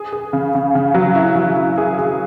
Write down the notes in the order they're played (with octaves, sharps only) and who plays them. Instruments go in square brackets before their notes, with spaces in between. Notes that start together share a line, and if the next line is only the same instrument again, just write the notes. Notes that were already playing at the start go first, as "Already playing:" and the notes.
Already playing: [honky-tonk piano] G#4
G#4
C#3
C#3
C#3
F#3
E4
F#3
E4
G#4
G#4